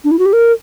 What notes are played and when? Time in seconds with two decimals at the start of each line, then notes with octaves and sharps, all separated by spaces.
0.04 D4
0.11 E4
0.19 F#4
0.26 G4
0.33 A#4